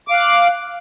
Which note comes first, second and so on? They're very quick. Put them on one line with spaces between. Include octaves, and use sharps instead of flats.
D6 F5 F#6